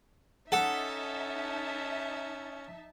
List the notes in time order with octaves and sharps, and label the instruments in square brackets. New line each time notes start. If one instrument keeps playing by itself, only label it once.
[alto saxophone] C#4 [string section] D#4 E5 A5 [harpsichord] A4 [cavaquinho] F#5 D#6